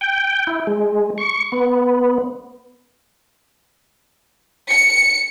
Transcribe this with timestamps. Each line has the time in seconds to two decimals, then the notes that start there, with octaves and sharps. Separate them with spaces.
0.01 G5
0.47 E4
0.67 G#3
1.18 C#6
1.52 B3
4.70 C#7